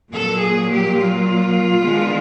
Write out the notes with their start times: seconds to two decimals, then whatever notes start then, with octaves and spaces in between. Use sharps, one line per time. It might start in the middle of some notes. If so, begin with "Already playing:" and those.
0.11 A#2 F#3 A#3 A4
0.40 G#4
0.69 G4
0.98 F4
1.84 D#3 G#3 B3 D4